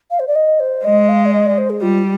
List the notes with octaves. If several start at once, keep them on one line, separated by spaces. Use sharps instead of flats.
F5
C5
D5
D#5
C5
G#3 D#5
F5
D5
D#5
D5
C5
G#4
G3 F4